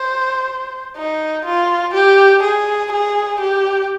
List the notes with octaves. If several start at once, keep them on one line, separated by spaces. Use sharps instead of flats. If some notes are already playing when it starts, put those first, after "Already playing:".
Already playing: C5
D#4
F4
G4
G#4
G#4
G4